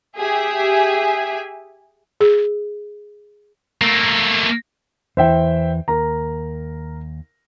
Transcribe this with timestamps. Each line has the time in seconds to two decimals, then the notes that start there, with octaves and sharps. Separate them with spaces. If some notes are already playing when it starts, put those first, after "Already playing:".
0.19 G4 G#4 E5 G#5
2.21 G#4
3.81 A3 A#3
5.17 E2 E3 C5 E5 G5
5.88 D#2 A#4 A#5